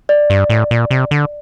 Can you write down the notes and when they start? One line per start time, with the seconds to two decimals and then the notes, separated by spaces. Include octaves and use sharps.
0.09 D5
0.30 G2
0.50 A2
0.71 A#2
0.91 C3
1.11 D3